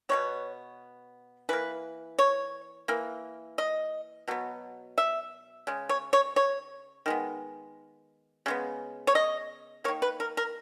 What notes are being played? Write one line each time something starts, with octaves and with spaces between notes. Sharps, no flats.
B2 G#3 B3 C#5
E3 A#3 B4
C#5
E3 A#3
D#5
B2 F#3 B3
E5
C#3 G#3
C#5
C#5
C#5
D#3 G#3 B3
C#3 G#3 B3
C#5
D#5
D#3 A#3 C#5
B4
A#4
A#4